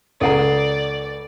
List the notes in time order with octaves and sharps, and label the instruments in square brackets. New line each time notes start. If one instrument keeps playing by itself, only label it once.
[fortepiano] C#2 [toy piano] A4 F#5 A#5 [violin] D5